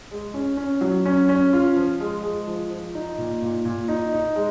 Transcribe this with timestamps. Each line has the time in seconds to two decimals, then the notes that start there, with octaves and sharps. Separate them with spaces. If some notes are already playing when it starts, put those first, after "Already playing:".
0.11 G#3
0.34 C#4
0.57 C#4
0.81 F#3
1.06 C#4
1.29 C#4
1.53 F4
1.76 F3
2.00 G#3
2.23 G#3
2.47 F3
2.70 F3
2.95 D#4
3.18 A#2
3.42 A#2
3.65 A#2
3.88 D#4
4.13 D#4
4.36 G#3